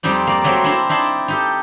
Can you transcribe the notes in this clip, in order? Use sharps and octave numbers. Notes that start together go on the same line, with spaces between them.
F2 G3 C4 D#4 D5
A#3 D5
F#3 A3 A#3 C4
D4 E4 A5 A#5 C6
D#4 E4 D5 A5 C6
D#4 G4 A4